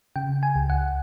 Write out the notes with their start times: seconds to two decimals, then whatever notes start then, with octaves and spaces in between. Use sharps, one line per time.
0.16 C#3 G5
0.43 G#5
0.56 C#2
0.70 F#5